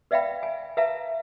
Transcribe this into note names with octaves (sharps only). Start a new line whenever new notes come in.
B4 D5 E5 F5 G5 B5
G#5
B4 E5 F5 A5 A#5